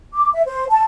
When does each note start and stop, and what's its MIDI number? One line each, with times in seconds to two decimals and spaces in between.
0.14 0.30 86
0.34 0.43 76
0.46 0.66 72
0.70 0.85 81